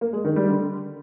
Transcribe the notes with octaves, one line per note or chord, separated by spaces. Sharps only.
A#3
G#3
D#3
G3
D3